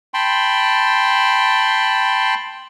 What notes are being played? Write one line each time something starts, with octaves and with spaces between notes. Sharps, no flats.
G5 A5 B5 C6